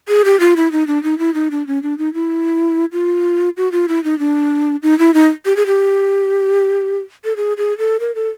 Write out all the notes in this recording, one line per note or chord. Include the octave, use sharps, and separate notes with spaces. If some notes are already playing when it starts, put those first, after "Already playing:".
G#4
G4
F4
E4
D#4
D4
D#4
E4
D#4
D4
C#4
D4
D#4
E4
F4
F#4
F4
E4
D#4
D4
D#4
E4
D#4
G4
G#4
G4
A4
G#4
G#4
A4
A#4
A4